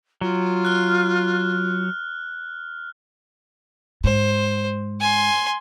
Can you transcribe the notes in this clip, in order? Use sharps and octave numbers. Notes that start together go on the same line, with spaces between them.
F#3 F4
F6 F#6
G#2 C5
G#5 C6